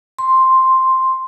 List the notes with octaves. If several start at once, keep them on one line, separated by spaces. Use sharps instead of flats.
C6